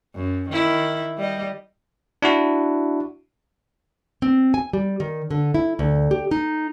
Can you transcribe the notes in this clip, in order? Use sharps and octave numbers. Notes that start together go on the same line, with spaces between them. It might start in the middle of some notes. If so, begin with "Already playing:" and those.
F#2
D#3 E4
G3 D#5
D4 E4 F#4
C4
G#5
G3
D#3
D3
E4
D2
G4
D#4